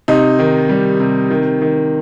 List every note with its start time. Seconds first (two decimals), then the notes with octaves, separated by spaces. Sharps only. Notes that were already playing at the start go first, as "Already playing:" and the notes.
0.08 C3 D#4
0.39 D#3
0.69 G3
1.00 C3
1.30 D#3
1.61 D#3